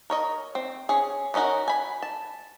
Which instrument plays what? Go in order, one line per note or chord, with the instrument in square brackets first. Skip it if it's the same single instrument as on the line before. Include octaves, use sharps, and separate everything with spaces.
[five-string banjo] A#4 C#5 D#5
C4
C#4 G#4
B3 C#4 D#4 F#4 A#4
G#5 B5
A5